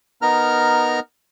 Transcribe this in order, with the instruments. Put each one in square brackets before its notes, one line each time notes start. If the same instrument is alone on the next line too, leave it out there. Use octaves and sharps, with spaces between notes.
[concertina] B3 D#4 A#4 A#5 F6